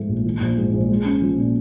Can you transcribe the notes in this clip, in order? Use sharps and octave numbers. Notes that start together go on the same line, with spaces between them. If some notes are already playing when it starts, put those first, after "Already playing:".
Already playing: G#2 F3 A3
A#1
E3
A#1
G#2
A#1
G#3
C#4
F3
A#2